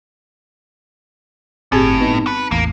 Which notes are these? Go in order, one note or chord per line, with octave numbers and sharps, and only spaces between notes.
G1 A2 C4 G4 G#4 G#6
G2 B3 D#4
B4 A5 C#7
A1 E2 A2 A#3